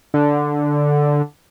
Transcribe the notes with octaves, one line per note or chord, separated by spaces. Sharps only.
D3